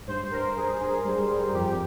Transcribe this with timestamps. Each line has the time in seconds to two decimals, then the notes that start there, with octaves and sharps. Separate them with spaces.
0.07 G2 C5
0.31 G2 A#4
0.56 G2 G#4
0.80 G2 G#4
1.04 G3
1.29 G3
1.53 F2 G4